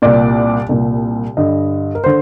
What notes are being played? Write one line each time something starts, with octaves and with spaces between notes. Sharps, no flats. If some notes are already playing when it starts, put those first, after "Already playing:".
C2 A#2 D5
C2 A#2
G2 D3 D#5
A#4
D3 C5